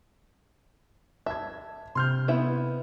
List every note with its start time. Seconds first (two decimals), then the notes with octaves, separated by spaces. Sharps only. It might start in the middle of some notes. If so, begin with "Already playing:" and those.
1.26 E5 A5 G#6
1.95 C3 C6 F6 G6
2.28 B3 E4 E5